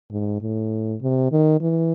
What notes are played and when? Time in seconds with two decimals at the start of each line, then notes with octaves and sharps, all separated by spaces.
0.11 G#2
0.41 A2
1.02 C3
1.32 D#3
1.61 E3